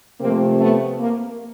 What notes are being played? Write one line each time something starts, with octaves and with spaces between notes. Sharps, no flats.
C3 F3 A3 A#3 C4
A3 B3
A#3